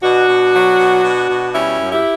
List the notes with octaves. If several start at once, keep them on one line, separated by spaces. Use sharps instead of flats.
B2 D4 F#4
B2
F#3
B2
B2
B2
G3 C#4 E4
F#2
E4 G4